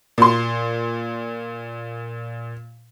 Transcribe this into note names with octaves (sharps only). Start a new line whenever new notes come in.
A#2 C6